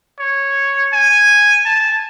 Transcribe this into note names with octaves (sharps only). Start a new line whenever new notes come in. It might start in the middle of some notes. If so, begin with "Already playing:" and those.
C#5
G#5
A5